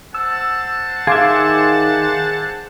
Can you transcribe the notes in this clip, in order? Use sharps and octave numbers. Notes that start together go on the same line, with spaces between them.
C5 F#5 A5 E6
D#3 G#4 E5 F5 C6 D6